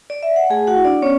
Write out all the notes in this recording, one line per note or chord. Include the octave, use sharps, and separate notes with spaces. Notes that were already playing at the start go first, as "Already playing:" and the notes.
D5
E5
F#5
A3 G#4 G#5
F#4 F#5
E4
D4 D5
B3 C#4 C#5